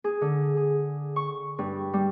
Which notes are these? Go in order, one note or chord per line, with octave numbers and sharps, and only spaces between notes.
G#4
D3
G#4
C#6
G2
G3